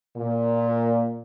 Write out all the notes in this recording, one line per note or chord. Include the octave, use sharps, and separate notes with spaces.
A#2